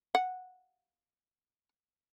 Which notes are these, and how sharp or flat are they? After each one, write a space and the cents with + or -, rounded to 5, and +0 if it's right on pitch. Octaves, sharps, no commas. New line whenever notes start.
F#5 -10